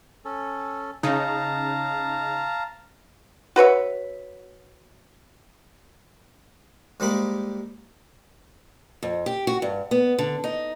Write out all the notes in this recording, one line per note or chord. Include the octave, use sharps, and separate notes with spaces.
C#4 A4
C#3 D#4 F5 A5 A#5
F#4 B4 C#5 E5
G#2 G3 G#3 A#3 B5 D6
F2
G4
F#4
G2
B3
D3
D#4